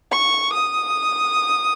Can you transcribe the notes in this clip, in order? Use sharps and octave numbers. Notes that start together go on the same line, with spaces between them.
C#6
D#6